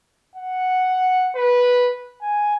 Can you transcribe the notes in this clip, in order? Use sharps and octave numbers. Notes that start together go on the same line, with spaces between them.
F#5
B4
G#5